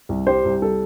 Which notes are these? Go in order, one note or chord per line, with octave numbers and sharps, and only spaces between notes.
C2
G3 G4 C5
C2
G3 A4